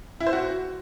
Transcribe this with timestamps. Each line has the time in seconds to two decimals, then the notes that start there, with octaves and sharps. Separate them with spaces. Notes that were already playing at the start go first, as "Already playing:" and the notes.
0.20 E4
0.27 C5
0.33 F#4